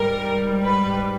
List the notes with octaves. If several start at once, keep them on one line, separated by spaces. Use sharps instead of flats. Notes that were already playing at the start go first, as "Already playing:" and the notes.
Already playing: G#2 G3 A#4
B4